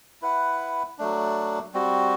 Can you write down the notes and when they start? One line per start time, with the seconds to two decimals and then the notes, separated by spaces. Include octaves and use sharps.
0.22 E4 B4 F#5
0.98 F#3 A3 D4
1.74 G3 C4 F#4